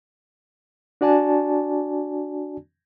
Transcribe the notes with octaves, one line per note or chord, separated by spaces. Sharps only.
D4 F#4 D5 G#5 A5